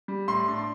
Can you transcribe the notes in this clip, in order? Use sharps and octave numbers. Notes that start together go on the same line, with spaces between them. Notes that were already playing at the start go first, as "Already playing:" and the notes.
G3
A2 C6
D4
C6